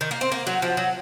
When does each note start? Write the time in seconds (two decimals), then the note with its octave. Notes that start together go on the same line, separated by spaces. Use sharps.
0.01 D#3
0.11 A#3
0.21 C4
0.32 A#3
0.47 F#3
0.62 F3
0.77 F#3